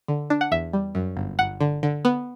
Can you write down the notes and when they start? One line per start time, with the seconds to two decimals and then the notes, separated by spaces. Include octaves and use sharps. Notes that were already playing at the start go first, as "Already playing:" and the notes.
0.08 D3
0.30 D4
0.41 F#5
0.51 E2 E5
0.73 G3
0.95 F#2
1.17 G1
1.39 G1 F#5
1.60 D3
1.83 D3
2.05 B3